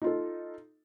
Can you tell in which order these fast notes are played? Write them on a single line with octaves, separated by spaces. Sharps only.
D#4 F4 A4